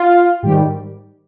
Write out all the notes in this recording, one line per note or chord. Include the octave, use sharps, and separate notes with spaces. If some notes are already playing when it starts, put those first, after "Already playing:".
Already playing: F4
G#2 D#3 G3 G4